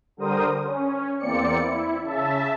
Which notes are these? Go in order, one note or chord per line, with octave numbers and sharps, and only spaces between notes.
D3 G3 A#4 C5 D#6
C#4
E2 A#3 C4 D5 C#7
E4
C#3 E5 A5